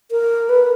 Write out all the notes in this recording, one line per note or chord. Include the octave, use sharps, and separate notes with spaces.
A#4
B4